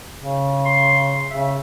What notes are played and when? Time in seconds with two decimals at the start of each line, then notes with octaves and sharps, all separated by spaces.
0.20 C#3
0.66 C6
1.30 C#3 E5